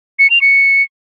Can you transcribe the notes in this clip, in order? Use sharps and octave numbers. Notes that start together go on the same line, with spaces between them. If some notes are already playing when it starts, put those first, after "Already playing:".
C#7
F7
C#7